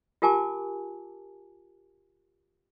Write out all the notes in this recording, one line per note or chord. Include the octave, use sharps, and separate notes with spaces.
F4 G4 A#4 G#5 A5 D6